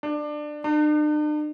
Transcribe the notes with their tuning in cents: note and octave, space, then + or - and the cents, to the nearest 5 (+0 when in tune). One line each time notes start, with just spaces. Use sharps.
D4 +20
D4 +45